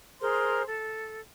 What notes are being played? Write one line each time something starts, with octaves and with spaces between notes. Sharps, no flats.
G#4 A#4 C5 C6
A4